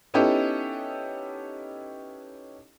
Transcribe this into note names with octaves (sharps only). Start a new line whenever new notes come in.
B3 C#4 D#4 E4 G4 A4